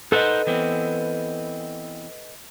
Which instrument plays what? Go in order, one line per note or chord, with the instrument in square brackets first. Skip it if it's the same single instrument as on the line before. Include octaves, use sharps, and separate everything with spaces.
[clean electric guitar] D#4 C5 F#5 [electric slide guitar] A4 B4 D#5
[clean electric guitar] E3 B3 C4